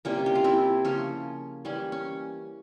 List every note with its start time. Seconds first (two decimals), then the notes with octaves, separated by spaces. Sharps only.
0.05 C3 G3 A#3 C#4
0.26 G4
0.35 F4
0.44 C4 E4
0.84 C#3 F3 A#3 C#4 F4
1.65 E3 G3 A#3 C#4
1.92 C#4